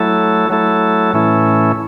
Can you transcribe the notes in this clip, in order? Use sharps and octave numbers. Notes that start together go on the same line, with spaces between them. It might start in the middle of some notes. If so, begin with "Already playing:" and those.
Already playing: F#3 A3 E4 A4
F#3 A3 E4 A4
A2 E3 A3 C#4 E4